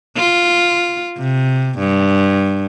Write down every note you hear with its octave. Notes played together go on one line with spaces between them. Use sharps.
F4
C3
G2